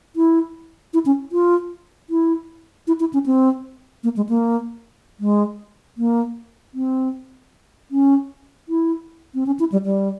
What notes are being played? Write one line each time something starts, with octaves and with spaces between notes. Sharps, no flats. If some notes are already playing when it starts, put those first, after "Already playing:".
E4
E4
C#4
F4
E4
E4
E4
C#4
C4
A#3
G#3
A#3
G#3
A#3
C4
C#4
E4
C4
C#4
E4
G3
G3